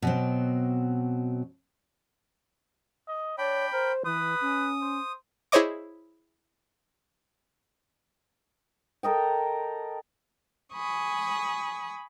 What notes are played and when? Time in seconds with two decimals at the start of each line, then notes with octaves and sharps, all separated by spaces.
0.02 B2 F#3 C4
3.08 D#5
3.38 D4 C#5 G5 B5
3.72 A#4 C5
4.05 E3 B4 D#6
4.41 C#4
4.81 C5
5.52 E4 G#4 C5 C#5 D#5 D6
9.03 A4 A#4 D#5 G5
10.73 G#5 B5 C#6 D#6